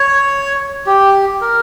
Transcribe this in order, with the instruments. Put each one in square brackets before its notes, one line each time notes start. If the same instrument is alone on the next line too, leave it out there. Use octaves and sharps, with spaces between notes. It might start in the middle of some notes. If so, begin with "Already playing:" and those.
Already playing: [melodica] C#5
G4
A#4